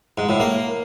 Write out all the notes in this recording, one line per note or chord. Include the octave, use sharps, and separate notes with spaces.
G#2
A2
A#3